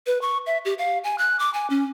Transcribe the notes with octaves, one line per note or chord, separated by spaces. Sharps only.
B4
C#6
E5
G4
F5
G#5
F#6
D6
G#5
C#4